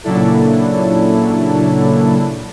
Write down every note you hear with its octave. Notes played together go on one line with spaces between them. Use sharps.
A#2 C#3 F#3 D4 E4 A4